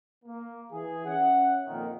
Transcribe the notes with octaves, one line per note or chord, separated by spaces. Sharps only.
A#3
E3 G#4
C#4 E5 F#5
F2 A#2 D#3